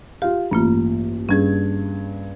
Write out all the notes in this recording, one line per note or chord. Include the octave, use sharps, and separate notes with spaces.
F4 G4 F5
A1 G2 A#3 F4
G2 C#4 G#4 G#6